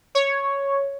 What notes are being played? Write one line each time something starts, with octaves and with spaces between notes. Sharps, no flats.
C#5